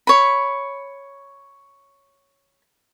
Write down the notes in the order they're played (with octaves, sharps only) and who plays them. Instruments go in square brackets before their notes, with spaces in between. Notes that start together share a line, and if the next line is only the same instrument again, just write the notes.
[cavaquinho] C#5 B5